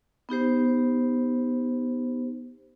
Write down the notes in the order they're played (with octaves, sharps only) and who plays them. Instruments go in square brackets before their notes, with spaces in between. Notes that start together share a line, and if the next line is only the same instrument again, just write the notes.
[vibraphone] B3 D#4 G4 C5